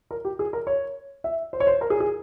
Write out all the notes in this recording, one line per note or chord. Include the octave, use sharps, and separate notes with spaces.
A#4
G4
G#4
A#4
C#5
E5
C5
C#5
C5
A#4
G#4
G#4